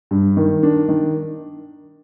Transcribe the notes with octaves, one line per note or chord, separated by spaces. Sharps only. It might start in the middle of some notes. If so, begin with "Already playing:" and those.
G2
D#3
D4
D#3